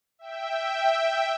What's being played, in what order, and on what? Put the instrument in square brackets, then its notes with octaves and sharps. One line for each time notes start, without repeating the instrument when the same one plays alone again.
[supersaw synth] E5 G5